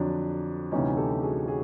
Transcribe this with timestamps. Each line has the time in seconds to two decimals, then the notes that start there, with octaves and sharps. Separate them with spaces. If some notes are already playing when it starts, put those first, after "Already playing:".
Already playing: F2 D3 F#3 D4
0.72 D2 C3 E3 G3 C#4 D#4
0.97 G4 A4
1.22 F#4 G#4
1.48 F#4 G#4